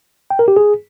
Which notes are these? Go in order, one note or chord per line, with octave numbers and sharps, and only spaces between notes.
G5
A#4
G4
G#4